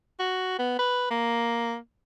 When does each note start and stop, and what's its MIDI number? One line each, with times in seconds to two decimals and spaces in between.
0.20 0.55 66
0.59 0.78 59
0.79 1.10 71
1.10 1.76 58